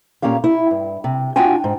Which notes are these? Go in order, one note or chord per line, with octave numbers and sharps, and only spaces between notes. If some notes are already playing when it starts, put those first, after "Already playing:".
A#2 A#3 C#4 G4 F5
E4
G2
C3
D4 F4 F#4 G5 G#5
G#2